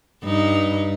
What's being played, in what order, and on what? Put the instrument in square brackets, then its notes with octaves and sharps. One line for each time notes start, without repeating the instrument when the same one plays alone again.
[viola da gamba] G2 D#4